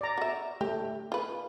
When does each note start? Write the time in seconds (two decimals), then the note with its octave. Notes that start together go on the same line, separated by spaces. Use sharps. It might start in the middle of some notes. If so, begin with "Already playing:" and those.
0.01 D5 A#5
0.18 F#4 E5
0.61 A3 G4
1.12 F4 B4